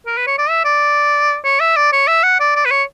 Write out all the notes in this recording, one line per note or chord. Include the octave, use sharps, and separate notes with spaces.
A#4
B4
C#5
D5
E5
D5
C#5
E5
D5
C#5
E5
F#5
D5
D5
B4
C#5